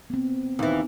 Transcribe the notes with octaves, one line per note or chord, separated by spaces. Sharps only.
B3 C4
D#2 E3